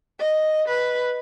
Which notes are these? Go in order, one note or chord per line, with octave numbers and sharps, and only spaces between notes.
D#5
B4